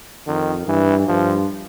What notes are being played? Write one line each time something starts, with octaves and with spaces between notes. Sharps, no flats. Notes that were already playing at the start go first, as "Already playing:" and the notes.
F2 D#3
G2 E3
G2 F3